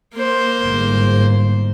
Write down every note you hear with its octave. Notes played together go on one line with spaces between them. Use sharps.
A#3 C5
G1 G#2